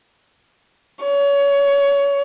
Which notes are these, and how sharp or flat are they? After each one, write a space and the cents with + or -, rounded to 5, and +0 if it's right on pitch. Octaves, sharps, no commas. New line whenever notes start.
C#5 +25